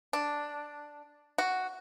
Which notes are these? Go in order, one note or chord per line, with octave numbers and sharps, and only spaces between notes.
D4
F#4